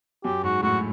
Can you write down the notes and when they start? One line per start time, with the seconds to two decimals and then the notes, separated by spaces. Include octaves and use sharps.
0.24 F#2 F#3 G4
0.43 G#2 G#3 F#4
0.62 A2 A3 F#4